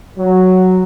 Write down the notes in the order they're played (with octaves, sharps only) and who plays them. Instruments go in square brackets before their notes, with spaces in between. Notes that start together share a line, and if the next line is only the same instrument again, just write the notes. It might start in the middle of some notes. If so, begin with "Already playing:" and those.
[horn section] F#3